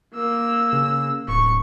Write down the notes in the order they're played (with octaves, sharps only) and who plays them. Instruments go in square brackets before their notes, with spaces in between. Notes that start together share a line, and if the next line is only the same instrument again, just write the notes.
[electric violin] A#3 E6
[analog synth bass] C#3
[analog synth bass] D1 [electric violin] C#6